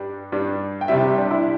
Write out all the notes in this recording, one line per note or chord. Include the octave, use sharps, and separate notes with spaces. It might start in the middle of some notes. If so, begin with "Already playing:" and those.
Already playing: G2 G3 D4
G2 G3 D4
G5
C2 C3 G3 E5
G4
D4
E4